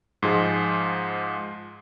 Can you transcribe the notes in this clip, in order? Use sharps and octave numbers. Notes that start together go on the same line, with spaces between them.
G#2 F3 G#3